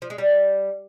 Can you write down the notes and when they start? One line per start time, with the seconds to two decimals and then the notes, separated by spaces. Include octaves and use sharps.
0.02 F3
0.10 G#3
0.18 G3